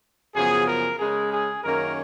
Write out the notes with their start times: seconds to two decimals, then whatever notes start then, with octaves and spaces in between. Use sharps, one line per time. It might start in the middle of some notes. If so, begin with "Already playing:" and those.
0.35 F#2 C#3 F3 B3 G#4
0.67 A#4
0.99 C#3 G#3 C#4 G#4
1.33 G#4
1.64 F#2 D#3 A#3 C#4 A#4